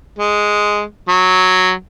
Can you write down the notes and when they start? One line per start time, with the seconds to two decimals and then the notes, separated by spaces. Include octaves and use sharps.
0.19 G#3
1.09 F#3